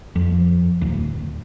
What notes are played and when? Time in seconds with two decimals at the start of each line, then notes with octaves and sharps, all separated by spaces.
0.16 F2
0.81 D1